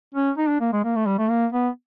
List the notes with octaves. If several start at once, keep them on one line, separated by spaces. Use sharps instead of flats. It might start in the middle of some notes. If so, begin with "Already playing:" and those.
C#4
D#4
D4
A#3
G#3
A#3
A3
G3
A3
A#3
B3